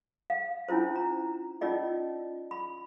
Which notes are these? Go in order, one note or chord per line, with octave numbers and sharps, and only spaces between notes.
F5
C#4 D4 E4 F4 C5
A#5
C#4 D#4 F4 D5 D#5
B5